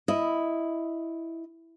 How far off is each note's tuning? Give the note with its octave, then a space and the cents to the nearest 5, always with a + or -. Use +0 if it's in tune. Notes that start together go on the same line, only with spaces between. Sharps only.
E4 +0 D#5 +0